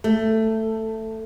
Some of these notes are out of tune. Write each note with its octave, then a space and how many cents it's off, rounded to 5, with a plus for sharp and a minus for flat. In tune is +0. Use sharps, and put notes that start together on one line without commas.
A3 +10